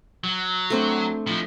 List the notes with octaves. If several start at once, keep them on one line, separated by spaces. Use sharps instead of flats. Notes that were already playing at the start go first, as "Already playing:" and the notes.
F#3
A3 C4 D4
A2 F3